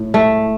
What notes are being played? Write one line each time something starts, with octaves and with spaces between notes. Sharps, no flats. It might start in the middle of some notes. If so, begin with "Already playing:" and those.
Already playing: A2
A3